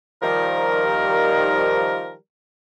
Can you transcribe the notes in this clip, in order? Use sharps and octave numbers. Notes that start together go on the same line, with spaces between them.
D#3 F3 G3 A#4